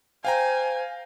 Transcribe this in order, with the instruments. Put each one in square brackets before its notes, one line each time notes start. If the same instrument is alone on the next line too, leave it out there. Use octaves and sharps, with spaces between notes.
[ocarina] C5 [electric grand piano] F5 G5 A#5 [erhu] G#5